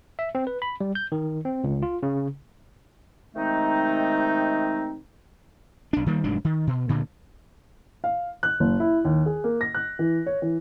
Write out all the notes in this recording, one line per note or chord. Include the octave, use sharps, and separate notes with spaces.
E5
C4
B4
B5
G3
G6
D#3
C4
C#2
F4
C#3
C3 D#3 G#3 A3 C4 D#4
B1 D4
D#3 G3 A#3
F1 G#2 F#3 D4
D#3
B2
D2 A#2 D3
F5
F#6
F#1
E4
D#2
G#4
A#3
A#6
F#6
E3
C#5
E3